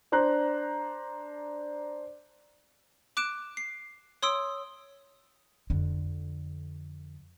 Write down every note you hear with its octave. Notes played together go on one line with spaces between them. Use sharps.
D4 C5 A#5 F#6
D6 F#6 D7 E7
C7
C#5 C6 D#6 E6 D7
F2 D3